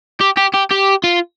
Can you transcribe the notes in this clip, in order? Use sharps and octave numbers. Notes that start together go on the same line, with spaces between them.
G4
G4
G4
G4
F4